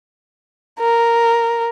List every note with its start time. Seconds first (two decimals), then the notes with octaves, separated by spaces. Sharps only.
0.80 A#4